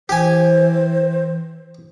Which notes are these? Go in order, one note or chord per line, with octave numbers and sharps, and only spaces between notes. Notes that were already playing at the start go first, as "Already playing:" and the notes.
E3 G4 C5 G#5